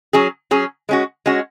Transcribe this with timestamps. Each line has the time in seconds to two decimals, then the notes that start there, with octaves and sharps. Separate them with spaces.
0.13 F#3 C#4 G#4
0.51 F#3 C#4 G#4
0.89 G#3 C#4 F#4
1.26 G#3 C#4 F#4